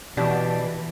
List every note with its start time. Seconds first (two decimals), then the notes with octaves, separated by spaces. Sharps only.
0.17 B2 E3 D4 G4